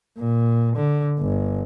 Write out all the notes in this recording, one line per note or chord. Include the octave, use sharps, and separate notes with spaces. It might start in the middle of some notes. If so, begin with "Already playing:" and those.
A#2
D3
G1